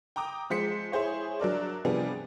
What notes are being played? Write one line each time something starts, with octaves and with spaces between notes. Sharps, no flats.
G5 A#5 D6 D#6
F3 G#3 C5 B6 C#7
E4 G#4 C5 C#5
F#3 D4 A#4 D5
C3 F3 G3 B3 D4 G#4